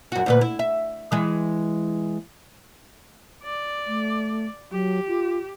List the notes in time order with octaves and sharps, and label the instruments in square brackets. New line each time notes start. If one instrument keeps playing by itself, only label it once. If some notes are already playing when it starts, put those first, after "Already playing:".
[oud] F#2 F#4
D2 A#2 B4
E4
E5
E3 G#3
[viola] D5
[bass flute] A3
[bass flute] F#3 [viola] G4
[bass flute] F4